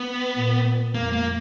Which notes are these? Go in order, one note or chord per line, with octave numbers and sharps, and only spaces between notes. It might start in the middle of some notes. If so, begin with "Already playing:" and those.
Already playing: B3
A#2
F2 A#3
A#3